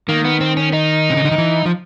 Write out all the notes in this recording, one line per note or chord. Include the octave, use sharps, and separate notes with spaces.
D#3 A#3
B3
C4
C#4
D#4
C3
C#3
D3
D#3
E3
F3